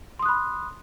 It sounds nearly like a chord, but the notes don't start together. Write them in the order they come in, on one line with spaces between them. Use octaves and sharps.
C6 D#6 F#6 B5